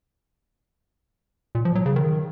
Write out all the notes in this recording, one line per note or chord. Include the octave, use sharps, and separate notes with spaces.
A#2
F3
F#3
C#3
D#3